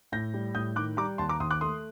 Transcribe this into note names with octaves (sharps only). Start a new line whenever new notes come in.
A2 G6 A#6
G3
A2 D#6 G6
D#3 D6 F#6
G3 A#5 D6
D#2 A5 C6
A#5 D6
D#2 C6 D#6
D6 F#6
A3 C6 D#6